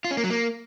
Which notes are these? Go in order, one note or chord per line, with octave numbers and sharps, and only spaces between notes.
F4
C#4
A#3
F#3
A#3